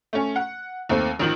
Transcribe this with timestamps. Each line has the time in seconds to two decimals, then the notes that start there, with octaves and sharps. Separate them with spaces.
0.13 A3 C#4
0.36 F#5
0.89 D#2 A3 C4
1.19 A1 D#3 F3 F#7